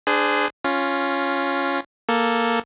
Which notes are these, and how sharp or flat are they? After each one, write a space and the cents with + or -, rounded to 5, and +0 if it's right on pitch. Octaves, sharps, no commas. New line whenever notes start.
D4 +0 G#4 +0 C5 -35
C#4 +0 F4 +0
A#3 +0 A4 +0